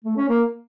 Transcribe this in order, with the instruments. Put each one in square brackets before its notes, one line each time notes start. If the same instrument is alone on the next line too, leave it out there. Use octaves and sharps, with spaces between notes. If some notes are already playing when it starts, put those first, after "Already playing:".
[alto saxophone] A3
C#4
A#3